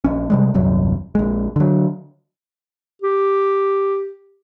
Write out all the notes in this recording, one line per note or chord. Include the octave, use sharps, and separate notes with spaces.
A#1 C#4
C3 G3 G#3
D#1 C2 F#2 F#3
A#1 G#3
D3 F#3
G4